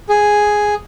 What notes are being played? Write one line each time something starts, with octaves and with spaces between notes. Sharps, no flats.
G#4